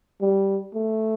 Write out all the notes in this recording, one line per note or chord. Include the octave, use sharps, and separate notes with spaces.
G3
A3